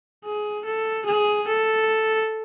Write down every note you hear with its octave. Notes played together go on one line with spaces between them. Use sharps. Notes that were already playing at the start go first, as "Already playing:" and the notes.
G#4
A4
G#4
A4